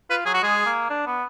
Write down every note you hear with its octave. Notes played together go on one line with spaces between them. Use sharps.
F4 B4
F#3 G#4
F#4
G#3 G#4
A#3
D4
B3